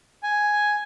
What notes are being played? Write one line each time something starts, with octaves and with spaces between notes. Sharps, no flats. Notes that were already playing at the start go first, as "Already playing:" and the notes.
G#5